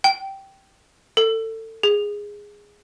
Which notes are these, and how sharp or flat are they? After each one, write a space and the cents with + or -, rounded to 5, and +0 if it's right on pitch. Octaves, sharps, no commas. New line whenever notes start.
G5 -10
A4 +25
G#4 -10